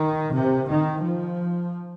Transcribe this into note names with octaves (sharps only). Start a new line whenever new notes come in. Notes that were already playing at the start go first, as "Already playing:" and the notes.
Already playing: D#3
C3
D#3
F3